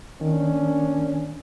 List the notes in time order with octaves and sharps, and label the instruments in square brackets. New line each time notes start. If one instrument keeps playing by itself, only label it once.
[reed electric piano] D#3 [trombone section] A#3 C#4 D4